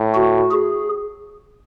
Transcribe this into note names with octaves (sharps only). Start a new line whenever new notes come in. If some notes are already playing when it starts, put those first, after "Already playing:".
Already playing: A2
F#4
G#4